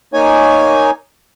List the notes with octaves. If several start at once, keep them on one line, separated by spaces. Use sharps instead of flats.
A#3 D#4 C#5 G#5